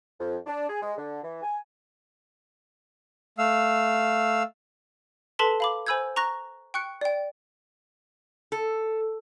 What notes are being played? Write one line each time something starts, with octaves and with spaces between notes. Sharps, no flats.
F2
D4
G#4
G#3
D3
E3
G#5
A3 F5 E6
A4 B4 A5 C6 B6
F5 B5 D6
C5 G#5 B5 E6 G6 G#6
A#5 C#6 F#6 A#6
G5 C#6 F#6 C#7
D5 G5
A4